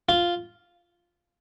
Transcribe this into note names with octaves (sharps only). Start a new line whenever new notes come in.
F4